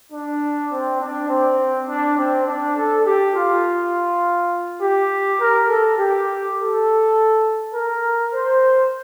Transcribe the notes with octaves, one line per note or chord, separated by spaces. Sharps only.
D4
C4
D4
C4
D4
C4
D4
A4
G4
F4
G4
A#4
A4
G4
A4
A#4
C5